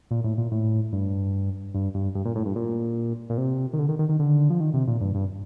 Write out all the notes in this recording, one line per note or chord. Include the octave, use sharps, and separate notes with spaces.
A#2
A2
A#2
A2
G2
G2
G2
G2
A#2
A2
G2
A#2
A#2
C3
D#3
D3
D#3
D#3
D#3
D3
F3
D#3
C3
A#2
G2
G2